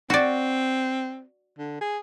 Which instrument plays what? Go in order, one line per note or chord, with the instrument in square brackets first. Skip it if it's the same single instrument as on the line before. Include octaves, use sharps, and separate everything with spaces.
[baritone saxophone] C4 [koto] F#4 D5
[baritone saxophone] D3
G#4